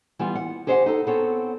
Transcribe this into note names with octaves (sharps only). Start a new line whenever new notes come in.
E3 G3 B3 F4
F#5
G4 G#4 C5 D#5 E5 F#5
D#4 A4
B3 C4 G#4 A4 C#5